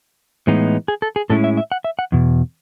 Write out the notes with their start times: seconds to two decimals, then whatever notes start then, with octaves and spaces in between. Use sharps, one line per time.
0.47 A2 E3 G#3 B3 D#4
0.88 G#4
1.02 A4
1.16 G#4
1.30 A2 G#3 C#4 E4 A4
1.44 E5
1.57 E5
1.72 F#5
1.84 E5
1.99 F#5
2.12 E2 B2